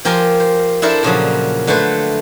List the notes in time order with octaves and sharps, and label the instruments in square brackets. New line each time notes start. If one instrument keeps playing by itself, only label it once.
[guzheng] F3 G4 A#4 G#5 C6
C5
D4 E4 A4 A#4 C5 E5
A#2 C#3 F3 F#3
D3 A3 B4 C5